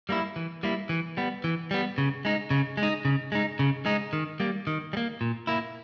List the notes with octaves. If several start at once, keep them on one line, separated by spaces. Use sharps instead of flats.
G3 A#3 E4
E3
G3 A#3 E4
E3
G3 B3
E3
G3 B3
C#3
G#3 D#4
C#3
G#3
D#4
C#3
G#3 D#4
C#3
G#3 D#4
D#3
G3 A#3
D#3
G3
A#3
A#2
A#3 E4